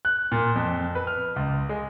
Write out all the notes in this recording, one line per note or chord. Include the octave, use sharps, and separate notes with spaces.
F#6
A#2
F2
B4
F6
C#2
G#3